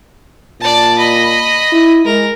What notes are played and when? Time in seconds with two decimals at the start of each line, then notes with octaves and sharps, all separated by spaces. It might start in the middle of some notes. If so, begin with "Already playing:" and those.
0.60 A#2 D5 A5
0.98 D#5 B5
1.72 E4
2.05 G#3 A#4